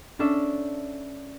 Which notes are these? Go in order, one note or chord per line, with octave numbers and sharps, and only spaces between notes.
C#4 D4 A4 D5 E5